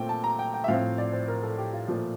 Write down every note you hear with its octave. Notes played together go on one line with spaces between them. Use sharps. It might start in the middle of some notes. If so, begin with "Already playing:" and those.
Already playing: A#2 A3 C4 G5
A5
A#5
G5
G5
E5
A2 F3 C4 F5
D5
C5
A#4
A4
G4
F4
A#2 F3 A3